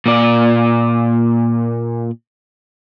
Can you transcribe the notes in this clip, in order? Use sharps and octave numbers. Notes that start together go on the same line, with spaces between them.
A#2 D5